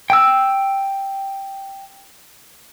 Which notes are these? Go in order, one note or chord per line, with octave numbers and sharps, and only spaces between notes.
G5 E6